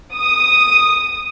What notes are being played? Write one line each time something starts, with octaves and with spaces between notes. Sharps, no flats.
D#6